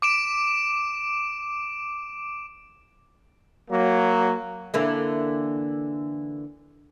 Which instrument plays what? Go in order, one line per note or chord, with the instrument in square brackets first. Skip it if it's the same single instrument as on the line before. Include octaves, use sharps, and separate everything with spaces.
[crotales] D6 D7 E7
[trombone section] F#3 A#3
[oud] D3 E3 A#3